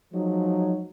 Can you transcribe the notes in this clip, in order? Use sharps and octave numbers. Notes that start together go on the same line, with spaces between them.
F3 F#3 G#3 D#4